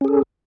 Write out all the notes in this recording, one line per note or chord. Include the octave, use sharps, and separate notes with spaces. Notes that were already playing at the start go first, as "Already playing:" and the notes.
C#4 G#4 A4